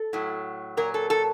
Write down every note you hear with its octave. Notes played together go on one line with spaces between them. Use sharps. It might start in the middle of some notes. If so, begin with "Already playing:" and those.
Already playing: A4
A2 F#3
A#2 F#3 A#4
A4
A4